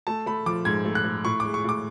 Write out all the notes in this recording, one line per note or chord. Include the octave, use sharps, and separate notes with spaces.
A3 A5
A3 B5
F3 D6
G#2 G#6
A3
F#6
A3
A2 C#6
G#3 D6
C#6
A2 D6